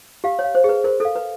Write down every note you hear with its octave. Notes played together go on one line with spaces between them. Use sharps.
G4 F5
C#5
F5
C5
G#4 B4
A#4 C5
A4 F5
B4